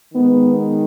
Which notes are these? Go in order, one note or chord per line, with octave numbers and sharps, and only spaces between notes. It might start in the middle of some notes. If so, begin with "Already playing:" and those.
D#3 G#3 B3